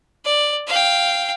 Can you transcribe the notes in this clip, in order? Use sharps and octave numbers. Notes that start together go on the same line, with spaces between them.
D5
F5 G5